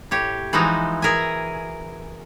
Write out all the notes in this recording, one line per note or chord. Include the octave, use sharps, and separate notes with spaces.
A2 G4 C#5
E3 F3 G#3 D#4 F#4
G#4 A#4 E5 G#5